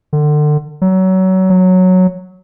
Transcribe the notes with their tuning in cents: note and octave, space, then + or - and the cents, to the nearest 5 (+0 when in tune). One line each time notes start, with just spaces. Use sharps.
D3 +30
F#3 +25
F#3 -5